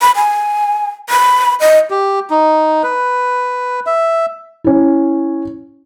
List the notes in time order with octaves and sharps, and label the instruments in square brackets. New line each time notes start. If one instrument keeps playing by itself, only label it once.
[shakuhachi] B5
G#5
B5
D#5
[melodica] G4
D#4
B4
E5
[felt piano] C#4 E4